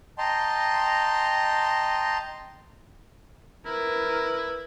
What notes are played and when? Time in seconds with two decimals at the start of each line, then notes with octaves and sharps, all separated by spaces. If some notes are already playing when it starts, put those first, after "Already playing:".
0.18 D#5 G5 A5 A#5 C6
3.66 E4 A#4 B4